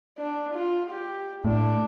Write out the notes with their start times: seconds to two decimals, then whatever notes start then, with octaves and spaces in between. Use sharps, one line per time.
0.18 D4
0.54 F4
0.90 G4
1.45 A2 D4